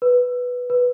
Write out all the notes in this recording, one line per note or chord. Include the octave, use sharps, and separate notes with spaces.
B4
B4